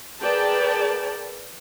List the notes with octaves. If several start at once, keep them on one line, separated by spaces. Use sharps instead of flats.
G#4 A#4 B4 D5 G5 A5